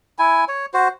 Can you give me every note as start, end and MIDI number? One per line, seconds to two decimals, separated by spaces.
0.19 0.45 64
0.19 0.45 80
0.48 0.66 73
0.74 0.88 66
0.74 0.88 72